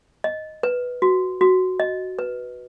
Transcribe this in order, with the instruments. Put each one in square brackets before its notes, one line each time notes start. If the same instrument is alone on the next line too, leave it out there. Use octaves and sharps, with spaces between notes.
[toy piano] D#5
B4
F#4
F#4
D#5
B4